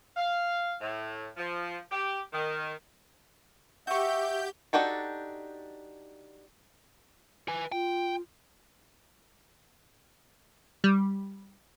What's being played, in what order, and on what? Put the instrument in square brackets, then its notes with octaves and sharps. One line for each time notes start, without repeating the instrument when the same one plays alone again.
[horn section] F5
A2
F3
G4
D#3
[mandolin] F#4 C#6 [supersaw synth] G4 G6 [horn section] E5
[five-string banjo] D4 D#4 F#4 G4 A4
[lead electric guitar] B4 G#5
[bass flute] F4 [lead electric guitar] G5
[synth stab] G3